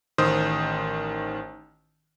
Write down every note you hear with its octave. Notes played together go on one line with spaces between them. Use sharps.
A1 D#3 C5 D#6